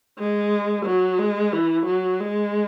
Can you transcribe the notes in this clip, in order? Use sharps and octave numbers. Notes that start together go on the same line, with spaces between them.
G#3
F#3
G#3
E3
F#3
G#3